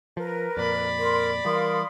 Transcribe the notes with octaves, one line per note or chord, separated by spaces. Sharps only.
F3 A#4 B4
F2 A#2 D5 B5
A#4 C6
E3 G3 A#4 F5 C6 D#6